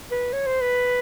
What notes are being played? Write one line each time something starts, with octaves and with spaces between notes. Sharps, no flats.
B4
C#5
C5
B4